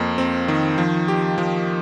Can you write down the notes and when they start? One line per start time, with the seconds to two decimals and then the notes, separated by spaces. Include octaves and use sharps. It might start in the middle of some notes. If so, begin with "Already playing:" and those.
Already playing: F2 A#3
0.18 C4
0.48 D#3
0.78 F3
1.08 G4
1.38 F3